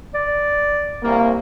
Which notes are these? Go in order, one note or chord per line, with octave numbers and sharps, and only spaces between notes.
D5
C2 A#3